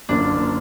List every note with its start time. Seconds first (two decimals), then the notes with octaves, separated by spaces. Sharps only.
0.09 F#1 F#2 D3 F3 A#3 D4